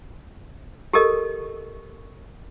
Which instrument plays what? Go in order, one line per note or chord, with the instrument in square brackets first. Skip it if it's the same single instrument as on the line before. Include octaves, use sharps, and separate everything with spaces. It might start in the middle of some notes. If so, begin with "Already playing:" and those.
[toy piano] G4 A4 A#4 D#5